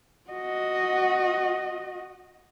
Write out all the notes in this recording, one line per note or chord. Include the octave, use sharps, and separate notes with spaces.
F#4 D#5